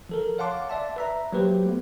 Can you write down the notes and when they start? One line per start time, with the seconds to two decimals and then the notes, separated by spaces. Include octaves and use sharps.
0.09 F3 A4 A#4
0.38 C#5 F5 F#5 A5 C6 D6
0.69 D5 E5 A5
0.96 B4 E5 A#5
1.32 F#3 A#3 G4 B4 C5
1.66 A3 B3